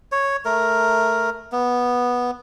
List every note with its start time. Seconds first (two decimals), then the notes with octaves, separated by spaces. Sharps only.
0.12 C#5
0.45 A3 A#4
1.52 B3